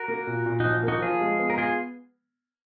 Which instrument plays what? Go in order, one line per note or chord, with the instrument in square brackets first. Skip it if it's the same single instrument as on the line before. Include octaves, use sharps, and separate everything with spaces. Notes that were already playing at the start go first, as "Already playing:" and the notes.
Already playing: [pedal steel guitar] F#4 A#4
[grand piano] A#3
A#2
A#2
[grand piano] F3 [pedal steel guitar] D#4 F#4
[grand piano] A#3
[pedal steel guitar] D#4 F#4
[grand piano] F3 [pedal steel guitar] F4 G#4
[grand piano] G#3
B3
[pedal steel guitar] A#4
F4 G#4